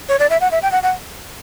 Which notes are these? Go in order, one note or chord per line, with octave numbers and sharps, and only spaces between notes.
C#5
D5
E5
F#5
E5
G5
F#5
F#5